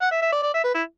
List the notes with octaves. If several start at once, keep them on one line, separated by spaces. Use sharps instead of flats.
F#5
E5
E5
D5
D5
E5
B4
E4